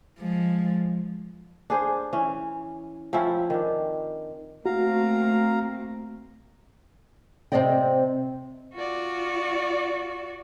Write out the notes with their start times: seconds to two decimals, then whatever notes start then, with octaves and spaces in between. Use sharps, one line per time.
0.19 F3 G#3
1.70 D4 G#4 C5
2.13 E3 C#4
3.13 F3 C4 C#4 E4
3.50 D#3 D4
4.66 A3 A#3 C4 F#4 F5 A#5
7.52 C3 G#3 C4 D5 D#5 G5
8.75 F4 F#4 D5